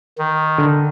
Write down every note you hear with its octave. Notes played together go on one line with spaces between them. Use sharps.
D#3
D3